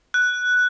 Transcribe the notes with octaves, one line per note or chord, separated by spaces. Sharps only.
F#6